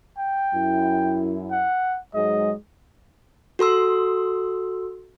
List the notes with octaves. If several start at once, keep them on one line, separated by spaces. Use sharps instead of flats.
G5
F#2 E4
F#5
G#2 F#3 G#3 D#5
F#4 A4 C6 E6